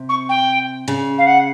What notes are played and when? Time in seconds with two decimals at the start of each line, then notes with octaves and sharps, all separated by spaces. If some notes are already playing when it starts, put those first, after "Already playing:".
Already playing: C3
0.09 C#6
0.29 G5
0.88 C#3
1.18 F5
1.26 F#5